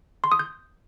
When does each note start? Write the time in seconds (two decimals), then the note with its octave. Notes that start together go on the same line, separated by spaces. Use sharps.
0.24 C6
0.32 D#6
0.39 G6